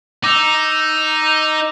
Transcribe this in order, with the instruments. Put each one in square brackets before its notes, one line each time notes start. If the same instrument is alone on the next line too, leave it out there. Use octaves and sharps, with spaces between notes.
[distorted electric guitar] D#4 [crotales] D6 E6 F7